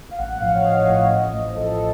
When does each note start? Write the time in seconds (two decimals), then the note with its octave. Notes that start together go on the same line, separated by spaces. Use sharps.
0.11 F5
0.18 A1 F#5
0.40 A2 F3 F5
0.54 C#5
0.63 A1 D#5
0.87 A2 F3
1.09 A1
1.33 A2 F3
1.56 A1 A4